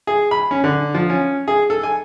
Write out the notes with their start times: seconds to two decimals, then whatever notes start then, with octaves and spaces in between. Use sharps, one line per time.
0.07 G#4
0.31 B5
0.51 C#4
0.64 D3
0.95 F3
1.10 C#4
1.48 G#4
1.70 A4
1.83 G#5